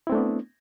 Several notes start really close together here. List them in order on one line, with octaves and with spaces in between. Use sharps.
E4 C4 A3 D4 B3